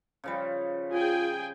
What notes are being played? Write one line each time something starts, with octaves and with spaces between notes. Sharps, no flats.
C#3 F3 G3
F4 G#4 G5 G#5